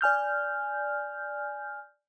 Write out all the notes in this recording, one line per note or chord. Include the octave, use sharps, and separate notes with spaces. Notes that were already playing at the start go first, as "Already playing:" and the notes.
D5 G#5 F6 G6